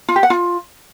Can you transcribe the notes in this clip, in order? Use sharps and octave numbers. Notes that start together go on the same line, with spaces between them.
F4
G4
F#5
F4